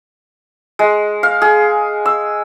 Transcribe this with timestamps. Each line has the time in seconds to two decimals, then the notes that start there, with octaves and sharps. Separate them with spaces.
0.79 G#3
1.23 F5
1.42 G#4
2.06 E6